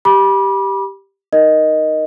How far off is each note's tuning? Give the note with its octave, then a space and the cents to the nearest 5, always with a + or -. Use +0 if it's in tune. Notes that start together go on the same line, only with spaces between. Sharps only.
G4 +0 B5 -30 D6 +5
D#4 +0 A#4 +0 D#5 +0